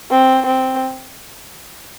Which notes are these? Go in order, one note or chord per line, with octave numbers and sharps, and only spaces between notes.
C4
C4